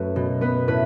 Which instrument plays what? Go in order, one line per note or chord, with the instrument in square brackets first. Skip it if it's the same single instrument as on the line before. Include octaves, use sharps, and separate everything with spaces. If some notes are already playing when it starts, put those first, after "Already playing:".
Already playing: [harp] F#2 A3 A4 B4
B2
B3 B4
A2 B4